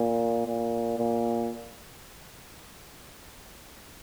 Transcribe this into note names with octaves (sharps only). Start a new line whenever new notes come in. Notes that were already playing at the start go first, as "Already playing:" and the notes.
Already playing: A#2
A#2
A#2